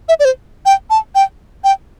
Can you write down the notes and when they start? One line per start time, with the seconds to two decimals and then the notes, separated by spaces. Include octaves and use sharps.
0.09 E5
0.20 D5
0.25 C5
0.66 G5
0.90 A5
1.15 G5
1.64 G5